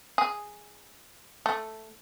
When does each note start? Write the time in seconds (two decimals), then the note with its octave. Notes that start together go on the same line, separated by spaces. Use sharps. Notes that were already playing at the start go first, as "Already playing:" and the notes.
0.18 G#4
1.46 A3